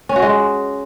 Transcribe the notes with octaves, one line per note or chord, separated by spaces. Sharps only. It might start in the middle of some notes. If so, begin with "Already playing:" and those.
C#4
F#4
G#3